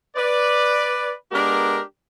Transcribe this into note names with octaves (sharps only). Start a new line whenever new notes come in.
B4 D5
G#3 B3 D4 G4 A#4